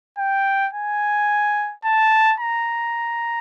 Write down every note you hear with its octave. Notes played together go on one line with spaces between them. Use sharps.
G5
G#5
A5
A#5